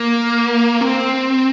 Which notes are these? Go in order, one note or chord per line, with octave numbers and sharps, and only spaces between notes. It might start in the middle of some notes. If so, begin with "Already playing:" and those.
Already playing: A#3
C4